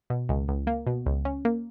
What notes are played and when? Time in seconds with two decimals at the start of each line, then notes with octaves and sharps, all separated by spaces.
0.10 B2
0.29 C#2
0.48 C#2
0.67 A#3
0.87 B2
1.06 C#2
1.25 C#4
1.45 A#3